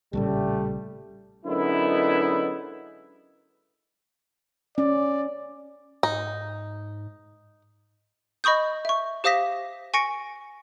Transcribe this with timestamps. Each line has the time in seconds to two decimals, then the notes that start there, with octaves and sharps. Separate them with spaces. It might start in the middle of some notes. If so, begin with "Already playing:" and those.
0.13 A#1 A2 C#3 G3 A3
1.46 F#2 D3 G#3 B3 D#4 E4
4.78 C#4 D5
6.03 G#2 D#4
8.44 D#5 B5 C#6 D#6 G6
8.85 E5 C#6
9.24 G4 C5 F5 D#6 A#6 B6
9.94 G#5 C#6 A#6 C#7 D7